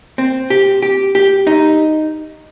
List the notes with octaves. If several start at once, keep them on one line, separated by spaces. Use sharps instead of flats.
C4
G4
G4
G4
D#4